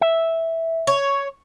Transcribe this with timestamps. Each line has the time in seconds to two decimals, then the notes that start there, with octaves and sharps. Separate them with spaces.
0.01 E5
0.87 C#5